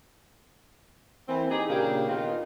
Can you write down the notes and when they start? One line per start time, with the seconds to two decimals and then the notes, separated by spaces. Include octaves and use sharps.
1.29 E3 A#3 C4
1.51 D#4 G4 G#4
1.69 A#2 C#3 A#3 D4 G4
2.08 D#3 B3 D#4 F4